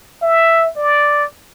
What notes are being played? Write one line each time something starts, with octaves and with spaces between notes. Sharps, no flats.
E5
D5